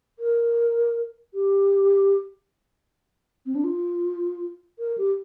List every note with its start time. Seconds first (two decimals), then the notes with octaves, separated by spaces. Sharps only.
0.19 A#4
1.34 G4
3.46 C4
3.55 D4
3.64 F4
4.79 A#4
4.98 G4